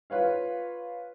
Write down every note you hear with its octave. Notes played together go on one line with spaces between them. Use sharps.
F4 B4 C#5 F5